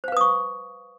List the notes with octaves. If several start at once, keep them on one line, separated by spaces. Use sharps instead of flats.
B4 C5 F5 C#6 D#6